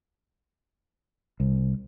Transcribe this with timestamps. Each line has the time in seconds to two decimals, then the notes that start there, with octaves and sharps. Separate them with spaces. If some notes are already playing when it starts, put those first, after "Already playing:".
1.40 C2